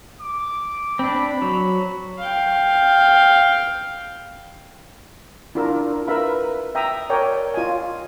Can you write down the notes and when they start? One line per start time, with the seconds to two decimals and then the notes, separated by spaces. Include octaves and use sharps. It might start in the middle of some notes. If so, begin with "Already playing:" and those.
0.20 D6
0.99 C4 D4 B5
1.42 F#3
2.18 F5 G5
5.55 D4 E4 F4 A#4 E6
6.07 A#4 B4 E5 F5 B5
6.75 E5 G5 A#5 D#6
7.10 A#4 C#5 D5 G5 G#5
7.54 F4 D#5 G#5